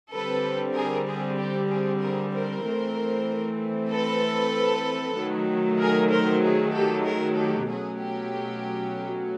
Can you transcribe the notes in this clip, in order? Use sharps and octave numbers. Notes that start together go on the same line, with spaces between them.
D3 G3 C4 A4 B4
G#4 A#4
G#4
G4
G#4
G#4 A#4
A#4 C5
E3 A3 C4
A4 B4
D#3 F#3 A3
G#4 A#4
A#4 C5
G#4
G4 A4
G#4 A#4
G4 A4
B2 F#3 A3 C#4 G#4
G4